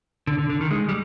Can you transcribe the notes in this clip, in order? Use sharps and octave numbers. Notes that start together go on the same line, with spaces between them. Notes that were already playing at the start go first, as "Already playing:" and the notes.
D3
D3
D3
D#3
G#3
G3